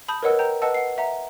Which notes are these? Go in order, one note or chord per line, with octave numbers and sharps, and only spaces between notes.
A5 B5 D#6 G6
A#4 B4 C#5 D#5 F#5 E6
G5 A#5 G6
B4 D#5 F#5 A5 E6
F#5 C7
E5 F#5 A#5